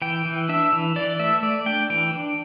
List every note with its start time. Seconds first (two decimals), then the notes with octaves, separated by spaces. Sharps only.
0.02 E3 G5
0.25 E3
0.49 D4 E5
0.72 E3
0.96 E3 D5
1.19 A3 E5
1.43 A3 D5
1.66 D4 G5
1.90 E3 G5
2.13 D4